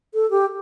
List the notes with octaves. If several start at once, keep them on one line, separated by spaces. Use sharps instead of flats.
A4
G4